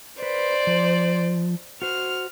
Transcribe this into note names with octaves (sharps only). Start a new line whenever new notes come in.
B4 C5 D5
F3
F#4 C5 F6